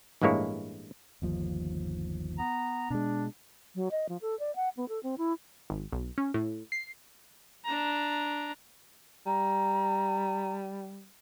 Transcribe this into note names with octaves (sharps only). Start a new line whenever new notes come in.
A1 G2 G#3 A#3 E4 C#5
G1 D#2 F3
B3 A#5
B2 G#3 D4
F#3
D#5
F3
A4
D5
F#5
B3
A4
C4
E4
G#1
B1
C#4
A2
C7
D4 A#5
G3 A#5